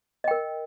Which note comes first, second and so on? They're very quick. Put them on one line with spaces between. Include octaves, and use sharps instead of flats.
D#5 G5 A#4